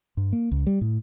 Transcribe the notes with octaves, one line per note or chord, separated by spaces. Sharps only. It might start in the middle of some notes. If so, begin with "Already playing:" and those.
G2
A#3
C#2
G3
A2